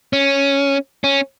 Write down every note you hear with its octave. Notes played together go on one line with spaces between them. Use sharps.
C#4
C#4